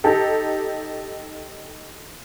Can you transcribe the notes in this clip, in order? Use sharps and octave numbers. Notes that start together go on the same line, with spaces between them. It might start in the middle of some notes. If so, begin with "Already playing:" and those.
D#4 G4 A4